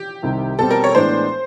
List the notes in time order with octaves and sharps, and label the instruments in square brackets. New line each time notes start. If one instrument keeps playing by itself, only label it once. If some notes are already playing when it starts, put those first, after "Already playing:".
Already playing: [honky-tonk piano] G4
[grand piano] C2 C3 D#3
[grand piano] B2 G3 C4 [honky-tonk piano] A4
[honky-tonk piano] A#4
C#5
[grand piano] A2 E3 G#3 B3 D4 [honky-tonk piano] C5